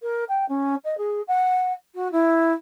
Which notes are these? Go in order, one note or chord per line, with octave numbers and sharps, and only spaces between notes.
A#4
G5
C#4
D#5
G#4
F#5
F#4
E4